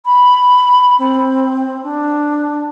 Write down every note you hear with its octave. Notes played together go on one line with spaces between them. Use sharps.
B5
C4
D4